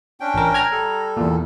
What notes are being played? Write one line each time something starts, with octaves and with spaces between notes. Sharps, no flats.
C#4 D4 G5
A1 A#4
A#5 F6 G#6
G3 A4
E2 A#2